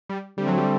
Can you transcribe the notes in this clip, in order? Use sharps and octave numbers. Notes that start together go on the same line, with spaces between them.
G3
D3 G3 A3 C4
F#3
G3